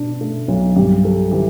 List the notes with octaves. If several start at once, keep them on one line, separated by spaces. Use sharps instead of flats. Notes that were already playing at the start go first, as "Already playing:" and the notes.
Already playing: B2 D4
A3
B1
G2 G4
G3 A4
E3 G4